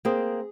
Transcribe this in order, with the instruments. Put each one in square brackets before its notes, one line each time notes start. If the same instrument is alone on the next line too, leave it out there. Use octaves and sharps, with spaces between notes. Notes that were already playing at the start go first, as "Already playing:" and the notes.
[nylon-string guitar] A#3 C4 [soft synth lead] G#4